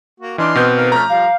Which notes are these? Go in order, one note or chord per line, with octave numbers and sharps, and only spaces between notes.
A#3 F#4
E3 D4 D#4 C6 D6 F6
B2 C4 B4 G6
D#3 A#4 F5
F3 A3 C#4 A#5 F6
F3 G3 F5